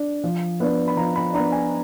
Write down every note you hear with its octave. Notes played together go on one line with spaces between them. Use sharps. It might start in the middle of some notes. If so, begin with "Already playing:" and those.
Already playing: D4
F3
B3 D4
B5
F3 A#5
B5
B3 D4 A#5
G#5